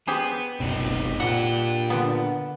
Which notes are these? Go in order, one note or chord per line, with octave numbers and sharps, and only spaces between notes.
B3 G4 G#4 C5
F#1 C2 B2 C4 D#4
A#2 D4 G4 F#5
D3 B3